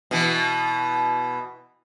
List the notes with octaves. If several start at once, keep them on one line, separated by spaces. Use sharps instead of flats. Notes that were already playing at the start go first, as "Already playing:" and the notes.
B2 E3